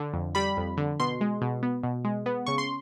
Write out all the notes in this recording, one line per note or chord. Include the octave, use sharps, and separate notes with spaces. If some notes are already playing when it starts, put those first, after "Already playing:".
Already playing: D3
F2
G3 B5
F2
D3
B2 C6
G#3
B2
B3
B2
G#3
B3
C#3 C#6
C6